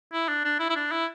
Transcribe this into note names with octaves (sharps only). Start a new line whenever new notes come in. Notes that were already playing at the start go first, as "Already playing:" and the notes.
E4
D4
D4
E4
E4
D4
E4